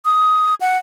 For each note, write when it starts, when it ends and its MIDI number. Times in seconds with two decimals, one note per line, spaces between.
0.05 0.54 87
0.61 0.77 78